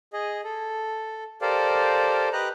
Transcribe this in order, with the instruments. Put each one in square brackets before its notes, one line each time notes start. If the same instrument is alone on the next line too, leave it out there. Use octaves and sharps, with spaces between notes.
[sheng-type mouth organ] G#4 D#5
A4
G4 A4 A#4 C5 D5 F5
G4 B4 D#5 A#5 F#6